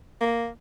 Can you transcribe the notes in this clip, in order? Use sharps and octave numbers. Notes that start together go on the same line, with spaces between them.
A#3